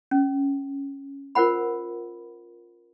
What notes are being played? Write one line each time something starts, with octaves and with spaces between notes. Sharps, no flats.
C#4
F4 A#4 C5 F#5 B5